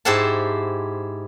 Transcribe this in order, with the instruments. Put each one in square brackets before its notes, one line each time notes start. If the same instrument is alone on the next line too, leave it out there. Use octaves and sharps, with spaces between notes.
[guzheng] G#2 E4 G4 C5 F#5 A5